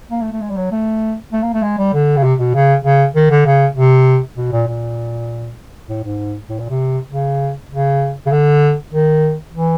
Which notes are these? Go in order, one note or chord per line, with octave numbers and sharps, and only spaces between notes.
A#3
A3
A3
G#3
G3
F#3
A3
A3
A#3
A3
G#3
G3
D3
C#3
C3
B2
C#3
C#3
D#3
D3
C#3
C3
B2
A#2
A#2
A2
G#2
A2
A#2
C3
C#3
C#3
C#3
D3
D#3
E3